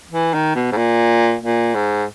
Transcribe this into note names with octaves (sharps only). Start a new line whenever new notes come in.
E3
D#3
B2
G#2
A#2
A#2
G#2